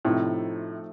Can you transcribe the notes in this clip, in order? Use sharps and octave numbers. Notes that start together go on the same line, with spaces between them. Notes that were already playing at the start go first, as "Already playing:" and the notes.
A2 C3 F3 A3 D#4